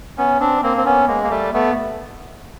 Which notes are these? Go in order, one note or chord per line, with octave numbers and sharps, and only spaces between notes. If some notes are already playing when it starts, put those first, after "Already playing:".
B3 C#4
C4 D4
A#3 C4
C4
B3 C#4
G#3 A#3
A#3
G3 A3
A3 B3